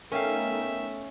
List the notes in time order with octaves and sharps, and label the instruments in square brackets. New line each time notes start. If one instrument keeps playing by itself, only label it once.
[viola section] A3 B3 D#4 [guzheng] C#4 F5 [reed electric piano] A#4 G5 [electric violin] E5